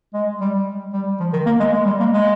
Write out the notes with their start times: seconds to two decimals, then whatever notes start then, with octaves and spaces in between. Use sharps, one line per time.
0.14 G#3
0.40 G3
0.93 G3
1.20 F3
1.33 D#3
1.46 A#3
1.60 G#3
1.73 G#3
1.86 G3
2.00 A#3
2.13 G#3